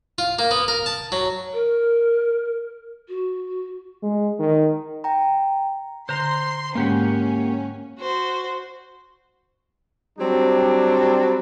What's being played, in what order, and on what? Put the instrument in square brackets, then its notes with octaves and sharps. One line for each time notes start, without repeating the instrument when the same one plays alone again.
[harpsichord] F4
A#3
B3
A#4
A5
F#3
[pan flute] A#4
F#4
[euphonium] G#3
D#3
[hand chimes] G5 A#5
[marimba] D3 [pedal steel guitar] C5 A#5 [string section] C6
[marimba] G#2 G#3 [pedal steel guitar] A#3 G4 F#5 [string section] C#4
[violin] F#4 C5
[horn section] F#3 G3 C4 D4